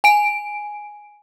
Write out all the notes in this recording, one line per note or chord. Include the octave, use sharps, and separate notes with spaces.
G#5 D7